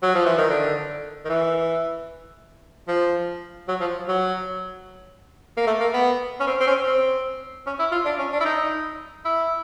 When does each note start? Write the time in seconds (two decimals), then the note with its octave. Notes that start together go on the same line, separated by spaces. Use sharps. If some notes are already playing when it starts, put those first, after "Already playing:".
0.03 F#3
0.15 F3
0.26 E3
0.38 D#3
0.50 D3
1.25 D#3
1.30 E3
2.88 F3
3.68 F#3
3.81 F3
4.08 F#3
5.57 A#3
5.67 A3
5.80 A#3
5.94 B3
6.40 C#4
6.47 C4
6.60 C4
6.67 C#4
6.86 C4
7.67 C#4
7.79 E4
7.92 F4
8.05 D4
8.19 C#4
8.32 D4
8.40 E4
8.45 D#4
9.25 E4